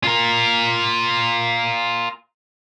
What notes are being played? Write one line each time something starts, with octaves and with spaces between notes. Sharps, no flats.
F4 A#4